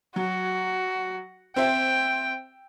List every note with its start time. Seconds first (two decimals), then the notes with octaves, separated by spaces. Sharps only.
0.16 F#3 F#4
1.56 C4 C5 E5 G5